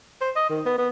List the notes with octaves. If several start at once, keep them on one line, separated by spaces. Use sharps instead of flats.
C5
D#5
D#3
B3
B3